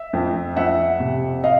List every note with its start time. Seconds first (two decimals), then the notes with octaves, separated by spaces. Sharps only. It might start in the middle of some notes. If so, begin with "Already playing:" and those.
Already playing: E5
0.13 F2
0.56 F2 E5 F#5
1.00 C3
1.44 D#5 F5